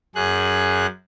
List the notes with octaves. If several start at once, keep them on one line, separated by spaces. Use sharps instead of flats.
F#2 G#4 F#6